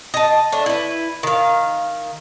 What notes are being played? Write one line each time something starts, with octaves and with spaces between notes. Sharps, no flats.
D#5 A5
A3 D4
E4 B4
D#3 F5